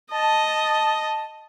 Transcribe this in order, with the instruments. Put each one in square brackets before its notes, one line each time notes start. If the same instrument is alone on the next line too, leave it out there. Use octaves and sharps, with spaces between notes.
[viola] D#5 [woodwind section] A5